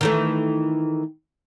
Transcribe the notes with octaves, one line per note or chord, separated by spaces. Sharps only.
D#3 E3 A3